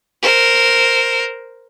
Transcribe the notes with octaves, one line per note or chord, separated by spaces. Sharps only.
A#4 C5